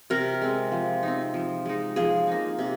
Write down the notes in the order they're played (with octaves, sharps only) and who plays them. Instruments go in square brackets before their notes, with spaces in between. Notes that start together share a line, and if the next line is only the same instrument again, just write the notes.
[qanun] C3 A#4
G#3 C4
F3
D#4
C4
F3
G#3 D#4
F3 G#4
A#3 D#4
C3